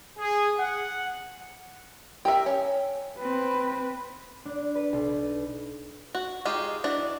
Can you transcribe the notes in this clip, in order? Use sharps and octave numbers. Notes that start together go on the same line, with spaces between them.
G#4
F#5
G4 A#4 E5
C#4
C4 B4
D4
B4
B1
F#4
G#3 D#4 F4 G4
E3 D4 F#4